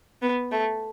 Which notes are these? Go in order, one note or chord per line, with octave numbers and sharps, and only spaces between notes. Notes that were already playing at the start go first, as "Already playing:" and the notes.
B3
A3